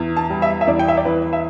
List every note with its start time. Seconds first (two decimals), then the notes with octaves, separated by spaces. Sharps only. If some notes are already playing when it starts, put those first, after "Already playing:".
Already playing: E2
0.17 A5
0.30 G3
0.42 E5
0.61 E5
0.67 E2 D5
0.79 G5
0.88 E5
0.97 D5
1.05 E3 B4
1.33 E5